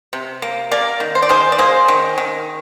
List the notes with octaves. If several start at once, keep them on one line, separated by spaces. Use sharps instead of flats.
C3
A#3
A#3 A#4 D5
D#3
C5
D5
D#3 G#4 C5
D5
A#3 G#4 C5
D#3
D#3